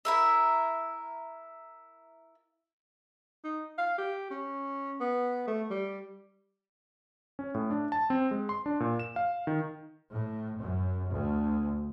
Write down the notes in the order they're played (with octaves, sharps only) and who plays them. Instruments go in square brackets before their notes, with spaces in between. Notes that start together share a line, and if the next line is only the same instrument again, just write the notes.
[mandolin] E4 A#4 E5
[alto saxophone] D#4
F5
G4
C#4
B3
A3
G3
[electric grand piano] C#4
A2
D4
A5
C4
G#3
C6
D4
A#2
E7
F5
D#3
[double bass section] A2
F#2
D2